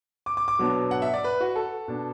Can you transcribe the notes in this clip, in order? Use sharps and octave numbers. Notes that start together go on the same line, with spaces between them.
D6
D6
D6
B2 F#3 B3 D4
F#5
E5
D5
B4
F#4
A4
B2 B3 D4